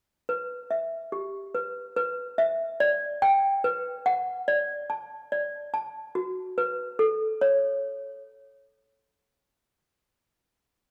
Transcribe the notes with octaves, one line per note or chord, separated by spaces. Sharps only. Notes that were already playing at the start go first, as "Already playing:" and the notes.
B4
E5
G4
B4
B4
E5
D5
G5
B4
F#5
D5
A5
D5
A5
F#4
B4
A4
C#5